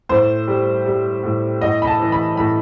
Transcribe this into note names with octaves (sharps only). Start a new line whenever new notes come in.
A2 C5
G3
G3
A2
A2 D#5
B5
A5
E3
B5
A2 B5